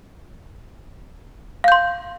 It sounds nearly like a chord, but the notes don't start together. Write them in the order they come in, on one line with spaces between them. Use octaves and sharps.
F5 G6 C6